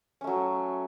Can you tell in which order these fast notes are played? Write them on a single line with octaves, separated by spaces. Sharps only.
C#4 A3 F#3